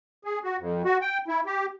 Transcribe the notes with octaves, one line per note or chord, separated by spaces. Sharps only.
G#4
F#4
F2
F#4
G5
E4
G4